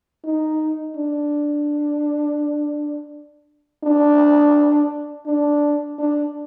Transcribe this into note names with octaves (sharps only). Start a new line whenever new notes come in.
D#4
D4
D4
D4
D4